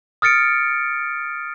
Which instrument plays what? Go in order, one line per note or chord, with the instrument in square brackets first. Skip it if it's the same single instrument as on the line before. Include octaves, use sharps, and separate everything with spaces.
[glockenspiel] D#6 F6 A6 C#7 D7